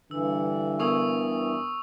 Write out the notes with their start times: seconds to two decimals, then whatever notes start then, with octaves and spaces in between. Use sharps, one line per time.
0.11 G2 D3 E3 E6
0.79 B3 A#4 G#5 C#6 D#6 E6